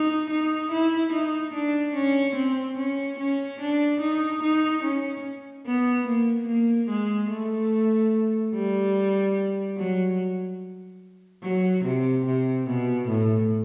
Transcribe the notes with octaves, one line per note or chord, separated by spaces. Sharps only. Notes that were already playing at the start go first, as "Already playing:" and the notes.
Already playing: D#4
D#4
E4
D#4
D4
C#4
C4
C#4
C#4
D4
D#4
D#4
C#4
B3
A#3
A#3
G#3
A3
G3
F#3
F#3
C3
C3
B2
A2